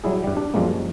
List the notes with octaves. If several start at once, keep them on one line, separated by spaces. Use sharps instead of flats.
F#3 G3 E4 G#4
G2 G3
D4
F#2 F3 G3 G#3 A#3